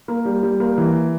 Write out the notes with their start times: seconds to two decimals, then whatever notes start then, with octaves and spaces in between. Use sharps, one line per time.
0.08 A#3
0.25 G3
0.43 G3
0.60 A#3
0.78 E3